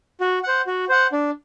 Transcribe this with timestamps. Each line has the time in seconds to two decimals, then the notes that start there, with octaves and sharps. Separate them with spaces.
0.21 F#4
0.43 C5 F#5
0.67 F#4
0.89 C5 F#5
1.12 D4